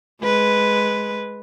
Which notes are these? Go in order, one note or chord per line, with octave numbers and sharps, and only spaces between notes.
G#3 B4